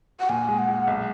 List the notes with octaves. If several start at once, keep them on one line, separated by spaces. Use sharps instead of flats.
F#5
A#2 G#5
G#3
F#5
G#3
B1